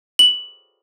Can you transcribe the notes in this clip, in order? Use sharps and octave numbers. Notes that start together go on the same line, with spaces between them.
F#7